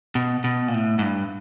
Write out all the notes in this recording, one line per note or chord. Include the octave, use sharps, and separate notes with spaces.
B2
B2
A#2
A2
G#2
G2